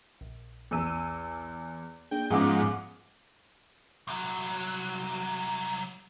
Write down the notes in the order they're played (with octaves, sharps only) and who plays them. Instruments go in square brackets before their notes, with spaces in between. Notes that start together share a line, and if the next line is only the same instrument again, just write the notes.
[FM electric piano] A#1
[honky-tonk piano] E2 E6 D#7
[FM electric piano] A#3 D4 G#4 [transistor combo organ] G5
[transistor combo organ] G#2 F3 [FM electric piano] G#3 B3 C#4 [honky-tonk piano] G#4 F#5 D6
[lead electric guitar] C2 F#3